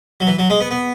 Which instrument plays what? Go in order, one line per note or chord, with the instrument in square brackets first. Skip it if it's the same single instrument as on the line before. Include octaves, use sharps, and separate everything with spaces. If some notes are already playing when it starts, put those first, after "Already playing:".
[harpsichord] F#3
E3
F#3
G#3
B3
B3